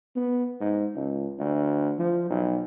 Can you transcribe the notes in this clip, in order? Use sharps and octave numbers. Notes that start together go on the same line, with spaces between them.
B3
G#2
C#2
D2
F3
B1